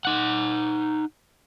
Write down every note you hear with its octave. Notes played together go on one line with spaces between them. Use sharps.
D#4 F#5